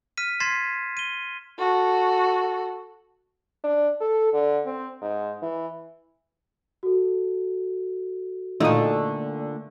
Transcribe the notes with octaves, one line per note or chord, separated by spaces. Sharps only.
F6 B6 D#7
C6 G#6 A6 B6 C7 E7
D#7 G7
F#4 A4
D4
A4
D3
C4
G#2
E3
F#4 A4
A#2 D3 A3 D#4 F4 D#6